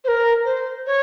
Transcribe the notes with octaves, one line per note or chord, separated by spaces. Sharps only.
C5
A#4
C5
C#5